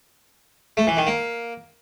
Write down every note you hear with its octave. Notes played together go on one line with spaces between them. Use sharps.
A3
E3
D#3
A#3